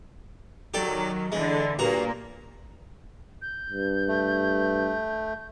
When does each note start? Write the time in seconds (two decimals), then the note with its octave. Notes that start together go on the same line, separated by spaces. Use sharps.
0.74 D#3 F#3 G4 A4 D5
1.32 D3 E3 G#3
1.79 G2 A#2 A#3 F#4 A#5
3.42 G6
3.70 G2
4.08 A3